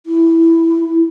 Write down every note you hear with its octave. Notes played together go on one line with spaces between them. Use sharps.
E4